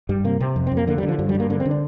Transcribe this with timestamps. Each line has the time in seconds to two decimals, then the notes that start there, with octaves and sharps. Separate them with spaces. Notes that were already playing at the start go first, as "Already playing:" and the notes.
0.09 G2 G3
0.24 C3 A#3
0.40 C3 C4
0.56 F2
0.67 C4
0.72 F2
0.77 A#3
0.87 D3 A#3
0.98 G3
1.03 D3
1.08 F3
1.19 G2 F3
1.29 G3
1.35 G2
1.40 A#3
1.50 D3 A#3
1.60 C4
1.65 D3
1.71 D4